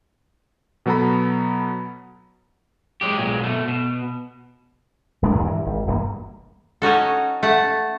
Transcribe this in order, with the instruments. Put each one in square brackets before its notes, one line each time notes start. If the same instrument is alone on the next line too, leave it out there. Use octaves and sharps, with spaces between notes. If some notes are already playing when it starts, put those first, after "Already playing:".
[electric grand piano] B2 F#3 B3 A4 A#5 B5
[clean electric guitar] F#3 G#3 G4
B1 A#2 G#3
B2 A3
B2
[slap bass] D#1 G#3 D4
D#2 A#2 D#3 G#3
G2 E3
G#1
D#1 G2 A#3
[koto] C#4 D#4 F#4 A4
A3 F#5 A5